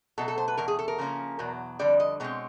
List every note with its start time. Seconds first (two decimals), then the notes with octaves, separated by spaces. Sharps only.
0.18 B2 F#3 A3 A4
0.28 A4
0.38 C5
0.48 B4
0.57 E2 B2 A#4
0.68 G#4
0.79 A4
0.88 A#4
0.98 C#3 F3 A#3 C#4
1.39 E2 B2 F#3
1.79 F2 D3 G3 D5
2.00 D#5
2.20 B2 G#3 C4 C#5